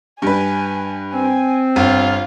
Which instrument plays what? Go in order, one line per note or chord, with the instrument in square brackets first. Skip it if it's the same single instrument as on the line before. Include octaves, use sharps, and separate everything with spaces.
[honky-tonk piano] G2 B4 [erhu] G#5
[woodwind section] C4 [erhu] G#5
[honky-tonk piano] G1 [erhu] F4